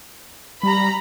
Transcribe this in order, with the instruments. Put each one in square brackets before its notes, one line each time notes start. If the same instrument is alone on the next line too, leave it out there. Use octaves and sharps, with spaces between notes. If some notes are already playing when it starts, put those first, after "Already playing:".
[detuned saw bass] G3 [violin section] A#5 B5